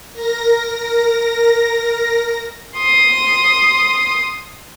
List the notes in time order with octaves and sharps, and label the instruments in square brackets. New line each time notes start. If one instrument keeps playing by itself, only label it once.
[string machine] A#4 A#6
[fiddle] C6 D#6